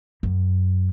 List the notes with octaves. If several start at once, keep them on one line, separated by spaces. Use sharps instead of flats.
F#2